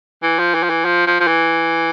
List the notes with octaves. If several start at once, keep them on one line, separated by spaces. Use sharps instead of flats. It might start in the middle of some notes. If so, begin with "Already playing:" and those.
E3
F3
E3
F3
E3
F3
F3
F3
E3